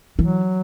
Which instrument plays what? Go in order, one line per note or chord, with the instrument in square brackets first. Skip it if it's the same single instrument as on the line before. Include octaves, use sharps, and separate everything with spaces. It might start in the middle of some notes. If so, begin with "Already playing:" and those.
[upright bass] E3 [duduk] F#3